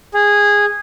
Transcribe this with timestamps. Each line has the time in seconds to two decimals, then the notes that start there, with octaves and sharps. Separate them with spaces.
0.14 G#4